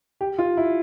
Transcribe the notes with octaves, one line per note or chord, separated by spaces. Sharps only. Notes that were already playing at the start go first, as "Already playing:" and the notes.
G4
F4
E4